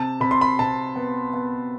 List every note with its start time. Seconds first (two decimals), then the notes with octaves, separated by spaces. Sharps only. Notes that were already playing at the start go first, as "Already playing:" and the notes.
Already playing: C3 A5
0.20 C3 B5
0.31 C6
0.41 B5
0.59 C3 A5
0.96 B3
1.34 B3